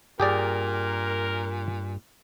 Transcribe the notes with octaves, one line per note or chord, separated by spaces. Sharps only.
G2 A#2 G4 G#4 A#4 D5